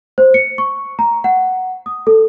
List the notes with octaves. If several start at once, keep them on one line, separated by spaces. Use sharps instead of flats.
C5
C#7
C#6
A#5
F#5
D#6
A4